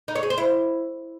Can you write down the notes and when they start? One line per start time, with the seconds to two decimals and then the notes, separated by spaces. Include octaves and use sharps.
0.08 D#4
0.15 C#5
0.23 G#4
0.30 C5
0.38 E4